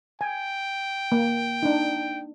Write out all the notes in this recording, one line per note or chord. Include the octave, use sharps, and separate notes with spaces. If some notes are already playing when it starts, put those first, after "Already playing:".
G5 G#5
A#3
D4 D#4